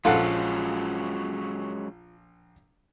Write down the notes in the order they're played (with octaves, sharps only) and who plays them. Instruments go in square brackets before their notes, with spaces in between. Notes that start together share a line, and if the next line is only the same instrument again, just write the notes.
[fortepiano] A#1 A4 F#5 [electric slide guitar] F#3 G#3 C#4 [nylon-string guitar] F4